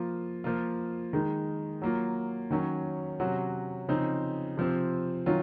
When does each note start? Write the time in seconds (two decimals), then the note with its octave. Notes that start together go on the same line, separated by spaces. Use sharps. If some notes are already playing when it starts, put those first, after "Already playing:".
Already playing: F3 A#3 F4
0.44 F3 A#3 F4
1.13 D#3 G#3 D#4
1.82 F#3 A#3 F4
2.50 D#3 F#3 C#4
3.20 C3 F#3 C#4 F#4
3.88 C#3 F3 C4 D#4
4.57 C3 F3 C4
5.26 D#3 F#3 C#4 F4